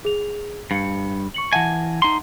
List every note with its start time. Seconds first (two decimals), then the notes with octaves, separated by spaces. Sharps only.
0.05 G#4 F7
0.71 G2 F5 C#7
1.34 C#6 C#7 F#7
1.53 E3 E5 F#5 G#5 A5
2.02 D#4 C6